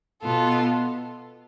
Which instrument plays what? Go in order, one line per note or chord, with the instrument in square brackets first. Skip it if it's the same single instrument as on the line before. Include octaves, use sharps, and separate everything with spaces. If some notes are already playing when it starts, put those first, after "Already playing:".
[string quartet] B2 B3 F4 A4